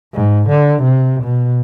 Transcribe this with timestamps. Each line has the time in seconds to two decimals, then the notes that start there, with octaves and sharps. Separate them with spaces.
0.14 G#2
0.49 D3
0.82 C3
1.23 B2